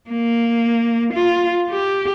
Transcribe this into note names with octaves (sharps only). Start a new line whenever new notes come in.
A#3
F4
G4